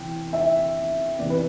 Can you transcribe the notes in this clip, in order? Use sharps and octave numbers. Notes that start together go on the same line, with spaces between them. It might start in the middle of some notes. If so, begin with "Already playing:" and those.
Already playing: C3 E3 B3 G5
E5
C3 E3 B3 D5
B4